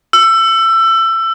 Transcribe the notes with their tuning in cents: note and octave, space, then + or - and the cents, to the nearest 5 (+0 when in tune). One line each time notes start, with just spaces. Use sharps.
E6 +25